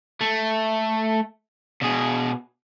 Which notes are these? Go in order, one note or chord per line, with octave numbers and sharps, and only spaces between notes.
A3
B2 G#4